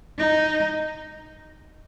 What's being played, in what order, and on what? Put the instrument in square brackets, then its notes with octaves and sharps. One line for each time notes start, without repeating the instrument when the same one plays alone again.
[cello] D#4